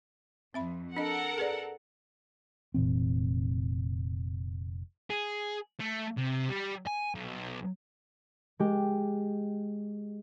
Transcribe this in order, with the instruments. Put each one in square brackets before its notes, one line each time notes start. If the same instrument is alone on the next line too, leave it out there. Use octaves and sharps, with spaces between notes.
[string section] F2 [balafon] C4 E5 B5
[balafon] D4 D#5 [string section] A4 A#4 F#5
[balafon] G#4 B4 D5
[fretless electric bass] F1 A#2 E3 C4
[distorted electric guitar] G#4
A3
C3
G3
G#5
B1
[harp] G#3 G4